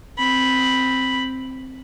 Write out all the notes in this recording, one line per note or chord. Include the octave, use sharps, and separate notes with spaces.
C4 B5